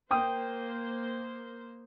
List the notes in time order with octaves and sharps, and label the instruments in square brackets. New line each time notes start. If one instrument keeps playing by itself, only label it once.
[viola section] A#3 C5 [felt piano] G5 D#6